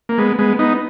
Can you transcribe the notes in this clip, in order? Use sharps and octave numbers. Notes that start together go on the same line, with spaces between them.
A#3
G#3 B3
G#3 B3
B3 D#4